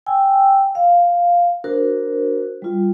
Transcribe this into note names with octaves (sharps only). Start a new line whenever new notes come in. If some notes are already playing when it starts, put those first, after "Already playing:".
G5 G#5 E6
F5
D4 F#4 A#4 C5
G3 F4